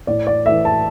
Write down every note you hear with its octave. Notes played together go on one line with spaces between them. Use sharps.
A2 D5
D5
E3 A3 E5
A5